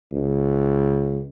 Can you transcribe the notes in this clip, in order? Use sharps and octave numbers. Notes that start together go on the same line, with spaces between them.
C#2